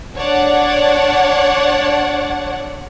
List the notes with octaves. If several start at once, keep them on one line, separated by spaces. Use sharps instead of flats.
D4 C#5 D5 F#5